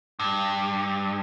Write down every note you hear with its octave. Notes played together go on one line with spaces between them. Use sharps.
G2